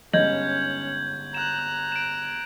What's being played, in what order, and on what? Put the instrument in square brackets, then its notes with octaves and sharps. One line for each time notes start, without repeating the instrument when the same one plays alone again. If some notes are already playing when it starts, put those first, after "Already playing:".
[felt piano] G1 G#2 [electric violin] C#4 [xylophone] D#5 [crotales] G6 G#6 F#7
[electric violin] A#5 F#6 [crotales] E7
[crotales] D7 E7